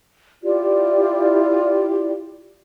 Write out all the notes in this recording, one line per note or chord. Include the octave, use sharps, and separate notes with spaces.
E4 F4 G4 D5